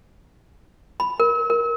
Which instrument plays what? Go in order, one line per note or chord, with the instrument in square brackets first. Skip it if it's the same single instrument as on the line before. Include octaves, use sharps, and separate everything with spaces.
[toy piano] B5
A#4
A#4